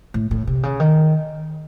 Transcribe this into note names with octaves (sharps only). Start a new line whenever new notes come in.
A2
A2
C3
C#3
D#3